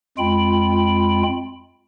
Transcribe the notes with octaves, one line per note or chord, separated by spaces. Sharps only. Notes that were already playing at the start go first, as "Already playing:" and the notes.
F2 G#3 F4 G5 B5